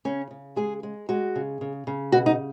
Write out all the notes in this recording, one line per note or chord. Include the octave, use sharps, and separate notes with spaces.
C#3 C#4
C#3
G#3 G#4
G#3
G#3 F#4
C#3
C#3
C#3
B2 F#4
D#4